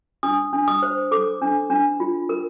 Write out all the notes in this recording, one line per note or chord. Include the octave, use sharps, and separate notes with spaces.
D4 D#6
D4
D#6
C5
A4 D6
D4
D4
F4
A#4